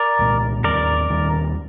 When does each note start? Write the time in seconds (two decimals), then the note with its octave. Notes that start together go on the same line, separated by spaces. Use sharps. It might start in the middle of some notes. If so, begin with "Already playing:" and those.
Already playing: A#4 D5
0.19 C2 A#2 G#3
0.64 D#2 D#3 G3 C4 A#4 D5
1.10 D#2 D#3 G3 C4